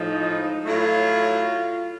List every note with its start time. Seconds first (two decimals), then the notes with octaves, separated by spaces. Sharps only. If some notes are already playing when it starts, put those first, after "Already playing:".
Already playing: A2 F3 G#3 D#4
0.65 A2 F#3 A3 F4